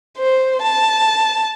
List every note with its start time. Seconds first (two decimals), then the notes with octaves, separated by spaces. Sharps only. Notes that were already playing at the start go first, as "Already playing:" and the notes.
0.18 C5
0.62 A5